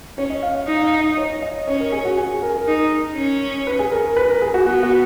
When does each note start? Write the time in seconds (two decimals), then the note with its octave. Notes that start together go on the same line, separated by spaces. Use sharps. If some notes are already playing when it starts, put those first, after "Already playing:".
0.18 C#4 C#5
0.30 D#5
0.43 F5
0.55 F5
0.67 D#4 D#5
0.84 F5
1.01 D#5
1.17 C#5
1.42 D#5
1.67 C#4 C#5
1.80 A#4
1.92 G#4
2.05 F#4
2.17 G#4
2.42 A#4
2.50 G#4
2.57 A#4
2.68 D#4
3.16 C#4
3.67 B4
3.79 G#4
3.92 A#4
4.04 A#4
4.16 B4
4.29 A#4
4.42 G#4
4.54 F#4
4.66 B3 F#4
4.83 F#4